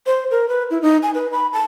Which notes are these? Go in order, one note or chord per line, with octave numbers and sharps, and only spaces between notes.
C5
A#4
B4
E4
D#4
G#5
B4
B5
A5